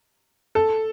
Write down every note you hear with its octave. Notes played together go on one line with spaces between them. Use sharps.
A4